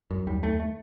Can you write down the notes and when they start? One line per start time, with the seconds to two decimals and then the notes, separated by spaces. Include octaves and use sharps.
0.11 F#2
0.27 D#2 G3
0.43 D#2 A3
0.60 A3